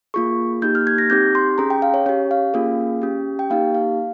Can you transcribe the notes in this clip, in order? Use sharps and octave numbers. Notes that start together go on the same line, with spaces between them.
A#3 F4 G#4 C#6
A#3 D#4 G4 G6
F6
G#6
A#6
C4 D#4 G4 G6
C6
C#4 G#4 A#5
G5
F5
C#5
C#4 G4 C#5
F5
A#3 C#4 F4 G#4
C#4 G4
G5
A#3 D#4 G4 F5
F5